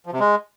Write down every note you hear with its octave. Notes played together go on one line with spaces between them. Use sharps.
F3
C3
G#3